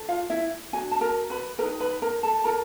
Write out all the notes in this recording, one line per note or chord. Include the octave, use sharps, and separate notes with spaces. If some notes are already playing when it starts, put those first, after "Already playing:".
Already playing: A4
F4 F5
E4 E5
D4 F#4 G#5
A5
A#4 A#5
B4 B5
D#4 G4 A#4 B4 A#5
B4 B5
A#4 A#5
A4 A5
F4 A4 A#4 A#5